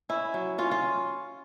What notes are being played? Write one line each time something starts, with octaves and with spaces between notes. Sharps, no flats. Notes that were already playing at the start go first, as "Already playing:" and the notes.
C#4 E4
F#3
C#4 F4
F4